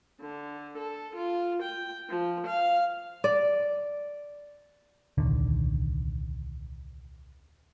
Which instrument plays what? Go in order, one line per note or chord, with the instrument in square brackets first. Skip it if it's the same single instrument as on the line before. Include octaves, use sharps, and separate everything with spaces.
[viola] D3
A4
F4
G5
F3
F5
[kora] D5
[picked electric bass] D#1 C2 D3 D#3